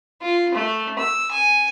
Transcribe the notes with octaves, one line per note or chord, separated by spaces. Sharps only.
F4
A3
E6
G#5